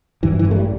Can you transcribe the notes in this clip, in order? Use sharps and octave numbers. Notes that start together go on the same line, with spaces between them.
G2 E3
E3
A1
A3
G3